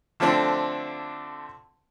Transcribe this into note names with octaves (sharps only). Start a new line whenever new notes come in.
D3 F3 A3 C4 D4